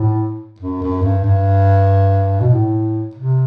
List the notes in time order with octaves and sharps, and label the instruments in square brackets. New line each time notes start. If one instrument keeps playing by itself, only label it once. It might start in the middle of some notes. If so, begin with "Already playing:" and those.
Already playing: [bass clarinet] A2
F#2
F#2
G2
G2
B2
A2
C3